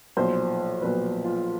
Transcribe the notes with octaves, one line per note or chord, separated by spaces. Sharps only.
B1 A#2 F3 C5
B1 A#2 F3 B4
F4